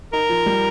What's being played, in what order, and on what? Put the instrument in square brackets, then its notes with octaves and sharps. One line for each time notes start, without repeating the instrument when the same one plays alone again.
[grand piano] D#4 [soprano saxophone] A#4
[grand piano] F3
G3